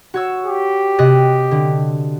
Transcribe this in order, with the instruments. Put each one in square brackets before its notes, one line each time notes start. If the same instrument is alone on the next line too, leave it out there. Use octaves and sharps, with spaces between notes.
[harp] F#4 C#5 E6
[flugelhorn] G4
[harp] C3 D#5 F#6
D3